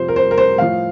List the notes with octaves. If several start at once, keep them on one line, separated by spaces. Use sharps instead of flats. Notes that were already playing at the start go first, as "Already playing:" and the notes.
Already playing: C3 F3 C5
A#4
C5
A#4
C5
A2 F3 F5